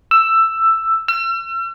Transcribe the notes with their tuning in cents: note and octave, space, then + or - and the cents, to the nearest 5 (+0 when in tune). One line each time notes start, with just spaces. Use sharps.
E6 +10
E6 +45